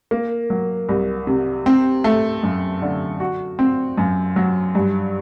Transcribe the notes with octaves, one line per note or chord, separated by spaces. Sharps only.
A#3
F#3
C2
C3
C4
A3
F#2
D3
F#4
C4
F#2
F#3
G2